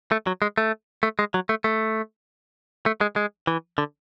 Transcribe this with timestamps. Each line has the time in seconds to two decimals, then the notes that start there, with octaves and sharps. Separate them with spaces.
0.12 A3
0.27 F#3
0.42 G#3
0.58 A3
1.03 A3
1.19 G#3
1.34 F#3
1.49 A3
1.64 A3
2.86 A3
3.01 G#3
3.16 G#3
3.47 E3
3.78 D3